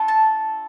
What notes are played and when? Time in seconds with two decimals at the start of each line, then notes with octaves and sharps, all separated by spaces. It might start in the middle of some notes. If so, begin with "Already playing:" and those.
Already playing: D4 F4 A4
0.08 A5